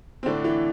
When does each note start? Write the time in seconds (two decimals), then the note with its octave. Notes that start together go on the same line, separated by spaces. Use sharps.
0.23 C4
0.26 A2 D3 D4
0.44 E3